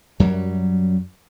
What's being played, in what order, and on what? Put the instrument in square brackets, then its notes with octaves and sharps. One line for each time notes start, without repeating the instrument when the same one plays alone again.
[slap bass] F#2 F#3 G3